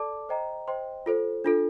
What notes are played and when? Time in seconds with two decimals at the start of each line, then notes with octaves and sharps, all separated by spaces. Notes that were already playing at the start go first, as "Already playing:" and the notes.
Already playing: A4 D5 A5 D6
0.29 C5 D#5 G5 A#5
0.68 C5 D#5 G5 C6
1.06 F4 A4 C5
1.44 D4 F4 A4